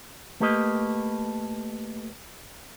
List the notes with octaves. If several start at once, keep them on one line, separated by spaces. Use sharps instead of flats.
A3 A#3 G4 B4 D#5